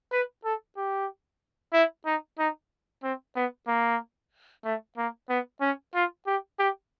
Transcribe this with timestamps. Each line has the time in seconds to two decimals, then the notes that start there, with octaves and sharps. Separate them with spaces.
0.12 B4
0.44 A4
0.77 G4
1.73 E4
2.06 D#4
2.39 D#4
3.03 C4
3.36 B3
3.68 A#3
4.65 A3
4.97 A#3
5.29 B3
5.61 C#4
5.95 F4
6.27 G4
6.59 G4